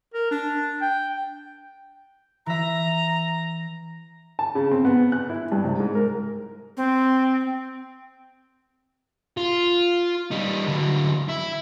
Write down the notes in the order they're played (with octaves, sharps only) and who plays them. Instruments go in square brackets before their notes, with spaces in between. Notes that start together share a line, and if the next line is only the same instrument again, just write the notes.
[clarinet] A#4
D4
G5
[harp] E3 E5 [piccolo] A#5
[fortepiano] A5
C#3
C4
B3
F#6
E4
G2
C2
G#2
A#4
[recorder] C4
[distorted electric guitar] F4
G3 D#4
D3 F#3
E4